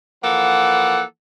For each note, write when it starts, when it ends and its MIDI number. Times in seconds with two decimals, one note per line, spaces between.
0.23 1.02 52
0.23 1.02 53
0.23 1.02 58
0.23 1.02 69
0.23 1.02 78